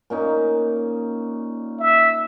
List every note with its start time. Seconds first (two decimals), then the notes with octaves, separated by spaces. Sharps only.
0.10 A#2 C#4 D#4
1.79 E5